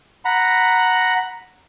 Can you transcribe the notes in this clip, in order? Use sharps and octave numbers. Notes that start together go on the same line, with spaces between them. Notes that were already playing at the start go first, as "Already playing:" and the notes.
F#5 A#5 B5